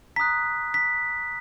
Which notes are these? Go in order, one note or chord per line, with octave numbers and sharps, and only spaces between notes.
A#5 D#6 F#6 B6
B6